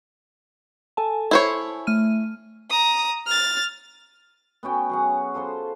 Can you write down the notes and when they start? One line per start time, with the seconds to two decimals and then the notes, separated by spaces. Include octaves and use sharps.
0.97 A4 G#5 A5
1.31 E4 C5 C#5
1.87 A3 F6 D#7
2.70 A#5 D#6
3.27 F6 A6
4.63 B3 C#4 F#4 G5
4.89 F#3 G#4 F#5
5.34 F4 A4 C5 C6